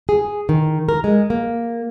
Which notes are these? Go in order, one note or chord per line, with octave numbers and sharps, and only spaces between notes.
G#4
D#3
A#4
G#3
A#3